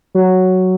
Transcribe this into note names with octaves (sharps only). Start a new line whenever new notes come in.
F#3